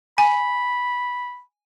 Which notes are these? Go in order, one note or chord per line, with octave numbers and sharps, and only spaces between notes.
G#5 B5